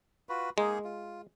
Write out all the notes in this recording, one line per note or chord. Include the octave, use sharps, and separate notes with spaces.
F4 F#4 B4
G#3 A#3 D#4 G#4
F4